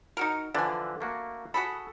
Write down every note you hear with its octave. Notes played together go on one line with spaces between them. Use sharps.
D#4 F#4 A#4
D3 E3 F3 D4 G#5
A3 A#3 F#4
F#4 G#4 A4 B5